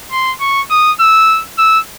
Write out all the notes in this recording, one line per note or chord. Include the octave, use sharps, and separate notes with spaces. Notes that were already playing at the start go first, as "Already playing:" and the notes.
C6
C#6
D#6
E6
E6